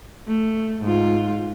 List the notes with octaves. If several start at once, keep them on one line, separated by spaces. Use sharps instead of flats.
A3
G#2 F4